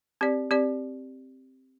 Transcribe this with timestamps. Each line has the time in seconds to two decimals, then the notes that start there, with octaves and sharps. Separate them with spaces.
0.21 C4 G4 D5
0.51 C4 G4 D5